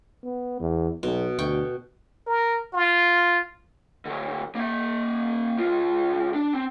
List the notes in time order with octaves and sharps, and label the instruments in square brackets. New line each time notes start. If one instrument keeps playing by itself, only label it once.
[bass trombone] B3
E2
[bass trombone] B1 [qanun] B2
[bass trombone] D2 [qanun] G5 C#6
[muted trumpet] A#4
F4
[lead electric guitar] D3 F#3
A#3 E5
C#2 F4
D4
C4